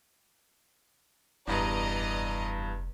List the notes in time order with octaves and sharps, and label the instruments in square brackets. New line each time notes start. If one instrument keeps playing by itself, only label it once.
[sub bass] F1 [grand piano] E2 G2 [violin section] D5 D#5 A#5